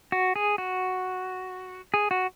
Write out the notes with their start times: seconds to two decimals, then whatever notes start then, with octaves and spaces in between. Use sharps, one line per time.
0.12 F#4
0.36 G#4
0.58 F#4
1.94 G#4
2.11 F#4